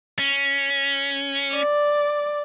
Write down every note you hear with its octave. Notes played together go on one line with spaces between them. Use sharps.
C#4
D5